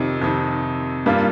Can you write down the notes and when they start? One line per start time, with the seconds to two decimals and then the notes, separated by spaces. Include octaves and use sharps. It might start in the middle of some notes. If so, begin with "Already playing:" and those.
Already playing: F2 C3 D#3
0.21 F2 C3 D#3
1.06 G2 G3 A#3 F4